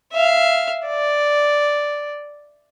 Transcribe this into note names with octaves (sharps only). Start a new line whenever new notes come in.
E5 F5
D5